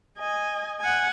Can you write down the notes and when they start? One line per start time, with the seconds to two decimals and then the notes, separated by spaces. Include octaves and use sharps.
0.18 D#5 G#5
0.80 F#5 G#5